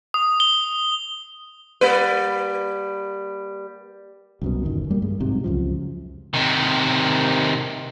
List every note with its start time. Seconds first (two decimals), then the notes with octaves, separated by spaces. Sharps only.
0.14 D#6
0.40 G7
1.81 G3 A#3 B4
4.42 C2 F#2 B2
4.63 G1 E2 D#3
4.89 F#2 G3 A#3
5.02 G2 G#3
5.20 A#1 G#2 C3 F#3
5.44 C#2 F#2 F3
6.34 C3 D#3